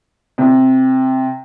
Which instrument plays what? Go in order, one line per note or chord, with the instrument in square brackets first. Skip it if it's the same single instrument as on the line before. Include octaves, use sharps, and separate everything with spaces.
[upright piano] C3